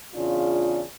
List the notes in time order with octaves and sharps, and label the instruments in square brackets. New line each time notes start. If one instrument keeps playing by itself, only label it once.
[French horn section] E2 C#3 D4 F4